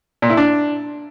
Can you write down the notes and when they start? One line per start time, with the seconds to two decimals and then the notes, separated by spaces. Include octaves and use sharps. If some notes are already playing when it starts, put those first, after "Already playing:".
0.22 A#2
0.30 E4
0.37 D4